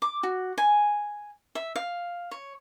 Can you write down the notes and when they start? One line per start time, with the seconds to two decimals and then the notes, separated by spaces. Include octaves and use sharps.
0.02 D6
0.23 F#4
0.58 G#5
1.55 E5
1.76 F5
2.31 C#5